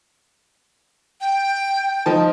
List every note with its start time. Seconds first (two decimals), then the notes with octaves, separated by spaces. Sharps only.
1.21 G5
2.06 F3 D#4 A5